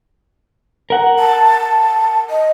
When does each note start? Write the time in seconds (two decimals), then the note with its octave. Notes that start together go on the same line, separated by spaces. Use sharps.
0.90 A#4 F#5
1.19 A5
2.30 D#5